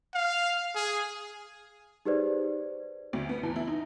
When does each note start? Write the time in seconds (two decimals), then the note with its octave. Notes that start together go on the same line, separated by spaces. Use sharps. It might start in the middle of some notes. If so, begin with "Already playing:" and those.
0.15 F5
0.76 G#4
2.05 D#4 G4 G#4 B4 C5 D5
3.13 D2
3.29 B3
3.43 E2
3.56 E4
3.67 D#4